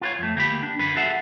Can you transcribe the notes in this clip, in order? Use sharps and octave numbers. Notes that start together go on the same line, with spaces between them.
F4 B4 C#5
F2 A3
D2 A#3 G4 B5
D4
F#2 D3 B4
F#4 G#4 A4 E5 F#5